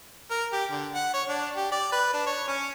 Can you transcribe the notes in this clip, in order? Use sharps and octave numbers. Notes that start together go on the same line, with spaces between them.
A#4
G4
D3
F#5
C#5
D4
G4
D5
B4
D4
C#5
C#4